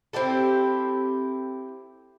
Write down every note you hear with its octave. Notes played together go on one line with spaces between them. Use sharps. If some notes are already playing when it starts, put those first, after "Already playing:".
C4 E4 G4 A4